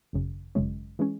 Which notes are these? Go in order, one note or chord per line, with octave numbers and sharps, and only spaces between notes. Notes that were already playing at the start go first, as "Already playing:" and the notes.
G#1 F#2 C#3
G#1 F#2 C#3 G#3 C#4
E3 G#3 C#4